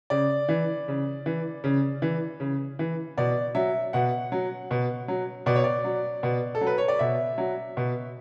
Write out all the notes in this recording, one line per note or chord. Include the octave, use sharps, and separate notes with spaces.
C#3 D5
E3
C#3
E3
C#3
E3
C#3
E3
B2 D5
F#3 E5
B2 F#5
F#3
B2
F#3
B2 D5
C#5
D5
F#3
B2
A4
F#3
B4
C#5
D5
B2 E5
F#3
B2